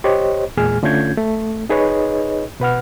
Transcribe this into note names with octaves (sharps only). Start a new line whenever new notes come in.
G4 C5 C#5 D#5
E2 A#2 G#3 G#4 G#5 F6
D3 A3 C#4 F4 G6 G#6
A3
D#4 G#4 B4 C#5 D#5
B2 B4 F#5 F6